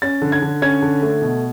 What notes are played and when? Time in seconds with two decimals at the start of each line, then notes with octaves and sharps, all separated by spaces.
0.02 C#4 A6
0.22 D3
0.32 G#6
0.42 D3
0.62 C#4 G#6
0.82 D3
1.02 A3
1.22 B2